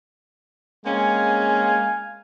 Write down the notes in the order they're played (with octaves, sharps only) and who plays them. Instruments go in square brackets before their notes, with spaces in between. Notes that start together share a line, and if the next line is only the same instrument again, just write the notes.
[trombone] G#3 [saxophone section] A#3 C4 C#4 [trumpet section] F5 G#5